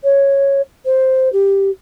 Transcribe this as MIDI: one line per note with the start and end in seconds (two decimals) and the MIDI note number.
0.03 0.61 73
0.85 1.29 72
1.32 1.70 67